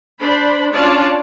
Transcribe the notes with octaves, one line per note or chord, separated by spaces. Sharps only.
D4 C5 B5
C#4 D4 F4 D5 A5